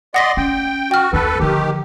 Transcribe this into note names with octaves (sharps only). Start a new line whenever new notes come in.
D5 D#5 F#5 C6 A#6 B6
C#4 G5
F#4 G5 F6
D#2 D#4 A4 B4
D3 D#3 F3 G4